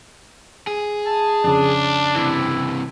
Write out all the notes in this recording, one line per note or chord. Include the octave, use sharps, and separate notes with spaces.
G#4
A5
F2 C#3 D4
C3 E3 E4